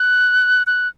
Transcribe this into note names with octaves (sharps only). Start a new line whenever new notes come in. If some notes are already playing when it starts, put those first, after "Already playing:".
Already playing: F#6
F#6